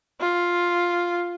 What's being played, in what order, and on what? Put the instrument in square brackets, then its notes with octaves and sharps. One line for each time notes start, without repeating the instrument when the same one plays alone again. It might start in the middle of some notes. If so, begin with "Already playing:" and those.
[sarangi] F4